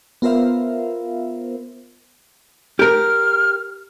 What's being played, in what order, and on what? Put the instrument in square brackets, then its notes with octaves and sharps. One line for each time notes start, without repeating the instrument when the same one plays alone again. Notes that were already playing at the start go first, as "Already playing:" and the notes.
[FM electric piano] B3 F4 A#4 C5 E5 F5
[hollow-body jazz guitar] G4 A#4 [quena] F6